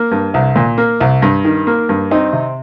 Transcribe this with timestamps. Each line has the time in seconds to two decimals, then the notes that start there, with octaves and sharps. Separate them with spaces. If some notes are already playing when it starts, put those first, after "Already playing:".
Already playing: A#3
0.12 G2
0.34 C2
0.56 A#2
0.78 A#3
1.00 C2
1.22 G2
1.45 D#3
1.67 A#3
1.89 G2
2.11 C4 D#4
2.33 C3